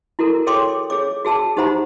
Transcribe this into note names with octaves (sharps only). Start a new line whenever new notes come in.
E4 F#4 A4 A#4
G#4 A4 C#5 G5 C6 D6
G#4 C#5 D6
F#4 G#4 A5 E6
D#4 G4 C5 F#5 A#5 B5